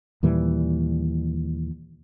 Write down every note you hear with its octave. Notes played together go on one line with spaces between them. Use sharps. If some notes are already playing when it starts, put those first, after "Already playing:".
D#2 A#2 E3 G3